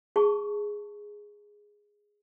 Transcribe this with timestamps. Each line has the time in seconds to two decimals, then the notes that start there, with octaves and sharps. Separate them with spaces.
0.16 G#4 A5 C#6